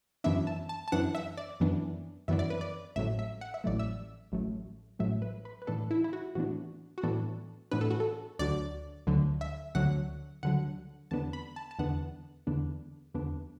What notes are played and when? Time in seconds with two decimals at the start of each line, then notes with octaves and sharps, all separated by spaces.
0.24 F#2 E3 B3 D4 E5
0.47 A5
0.69 A5
0.88 A5
0.92 F#2 E3 B3 D4 F#5
1.15 E5
1.37 D5
1.60 F#2 E3 B3 D4
2.28 F#2 E3 B3 D4 E5
2.39 D5
2.50 B4
2.61 D5
2.96 A1 A2 F#3 A3 E5
3.19 E5
3.41 F#5
3.54 E5
3.64 A1 A2 F#3 A3 D5
3.79 E5
4.32 A1 A2 F#3 A3
4.99 A1 A2 F#3 A3 E5
5.22 B4
5.45 B4
5.62 B4
5.67 A2 E3 B3 D4 A4
5.91 E4
6.04 E4
6.13 F#4
6.35 A2 E3 B3 D4 F#4
6.98 F#4
7.03 A2 E3 B3 D4 A4
7.71 A2 E3 B3 D4 B4
7.81 A4
7.90 F#4
8.00 A4
8.39 D2 D3 F#3 D5
9.07 D2 D3 F#3
9.41 E5
9.75 D2 D3 F#3 F#5
10.43 D2 D3 F#3 F#5
11.11 E2 D3 B3 D4 A5
11.33 B5
11.56 A5
11.71 A5
11.79 E2 D3 B3 D4 F#5
12.47 E2 D3 B3 D4
13.14 E2 D3 B3 D4